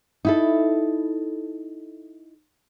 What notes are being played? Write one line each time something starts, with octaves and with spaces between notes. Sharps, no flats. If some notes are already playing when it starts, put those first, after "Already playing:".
D#4 E4 A4